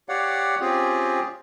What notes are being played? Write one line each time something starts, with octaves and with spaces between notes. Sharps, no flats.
G4 C#5 D5 F5 F#5
C4 C#4 F4 G4 G#4